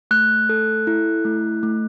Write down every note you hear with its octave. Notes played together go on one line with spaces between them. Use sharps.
A3 F#6
A4
E4
A3
A3